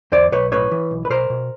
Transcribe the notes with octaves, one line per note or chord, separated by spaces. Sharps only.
E2 C5 D5
B1 B4 C#5
A2 B4 C#5
E3
B1
B4
B2 A#4 C5
B2